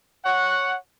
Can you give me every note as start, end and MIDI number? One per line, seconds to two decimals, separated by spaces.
0.25 0.75 73
0.25 0.75 78